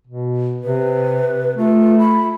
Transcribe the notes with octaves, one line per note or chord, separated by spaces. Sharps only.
B2
C3 B4
A3 F4
B5